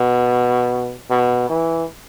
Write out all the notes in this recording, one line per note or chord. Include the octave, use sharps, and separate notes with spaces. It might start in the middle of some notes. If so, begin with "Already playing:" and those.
Already playing: B2
B2
E3